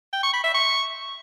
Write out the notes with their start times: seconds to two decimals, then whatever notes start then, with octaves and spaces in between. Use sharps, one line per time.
0.13 G5
0.23 C#6
0.34 B5
0.44 E5
0.54 C#6